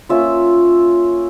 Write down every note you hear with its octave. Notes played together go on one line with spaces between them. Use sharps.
A#3 C#4 F4 E5